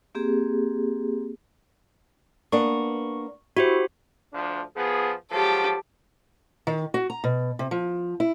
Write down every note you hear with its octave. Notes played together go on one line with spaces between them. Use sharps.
A#3 C4 G4 G#4
A#3 B3 D4 C#6
E4 F#4 G4 C5
D2 F3 D4
F3 B3 G#4
F3 F#3 G#3 G4 A4
D#3
F#4
A#5
B2
C3
F3
E4